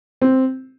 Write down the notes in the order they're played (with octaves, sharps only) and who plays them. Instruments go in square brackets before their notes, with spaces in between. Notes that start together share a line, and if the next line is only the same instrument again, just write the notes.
[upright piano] C4